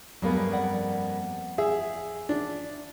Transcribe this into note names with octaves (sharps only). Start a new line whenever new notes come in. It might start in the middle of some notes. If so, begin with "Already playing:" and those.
G2 F#3 G#3 A#3 B3 G#4
F2 D5 F#5
G#4 E5
D4